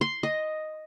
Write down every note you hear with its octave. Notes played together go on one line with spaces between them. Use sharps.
C6
D#5